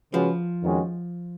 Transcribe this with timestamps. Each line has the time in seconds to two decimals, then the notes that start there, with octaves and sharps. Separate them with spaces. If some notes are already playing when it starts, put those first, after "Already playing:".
0.13 C#3 F3 G#3 C#4 F#4 B4
0.63 F2 D#3 G#3 C#4 F#4